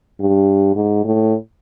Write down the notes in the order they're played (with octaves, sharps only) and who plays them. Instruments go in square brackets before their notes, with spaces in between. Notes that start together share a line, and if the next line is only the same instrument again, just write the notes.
[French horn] G2
G#2
A2